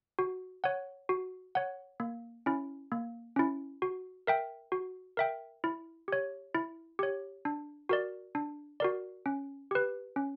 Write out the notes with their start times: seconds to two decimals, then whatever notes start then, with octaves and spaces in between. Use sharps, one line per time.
0.19 F#4
0.64 C#5 F#5
1.09 F#4
1.55 C#5 F#5
2.00 A#3
2.46 C#4 E4
2.92 A#3
3.36 C#4 E4
3.82 F#4
4.27 A#4 E5 G5
4.72 F#4
5.17 A#4 E5 G5
5.64 E4
6.08 G4 C#5
6.54 E4
6.99 G4 C#5
7.45 D4
7.89 F#4 A#4 D5
8.35 D4
8.80 F#4 A#4 D5
9.26 C#4
9.71 G4 B4
10.16 C#4